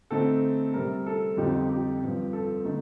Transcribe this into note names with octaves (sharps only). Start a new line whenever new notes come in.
D3 A3 C4 D#4 A4
C3 G3 C4 A#4
A4
F2 D3 G3 C4 D#4 G4
G4
G2 F3 C4
A4
D3 A3 D#4